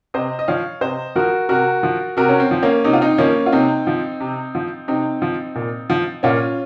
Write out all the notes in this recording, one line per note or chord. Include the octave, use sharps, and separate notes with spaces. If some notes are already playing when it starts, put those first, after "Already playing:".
C3 C5 D#5
D#5
F3 C#5 F5
C3 C5 D#5
F3 F#4 A#4
C3 F#4 A#4
F3
C3 F#4 A#4
C#4
C4
F3
A#3 C#4
C3 D#4
F4
C4 D#4
F3 A#3 C#4
F4
C3 C4 D#4
F3
C3
F3
C3 C4 D#4
F3
A#2
F3
A#2 C#4 F4